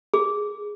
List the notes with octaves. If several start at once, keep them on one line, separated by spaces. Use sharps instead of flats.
G#4